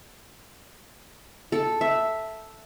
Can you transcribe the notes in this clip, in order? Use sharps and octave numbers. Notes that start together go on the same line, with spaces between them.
A4
E5